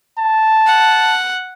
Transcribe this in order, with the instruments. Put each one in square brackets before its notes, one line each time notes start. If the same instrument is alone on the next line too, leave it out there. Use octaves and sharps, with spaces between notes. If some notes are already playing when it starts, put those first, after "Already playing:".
[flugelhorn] A5
[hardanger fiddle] F#5